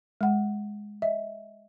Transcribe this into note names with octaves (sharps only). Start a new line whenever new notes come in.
G#3 F#5
D#5 E5